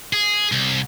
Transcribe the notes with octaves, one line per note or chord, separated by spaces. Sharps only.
G#4
C2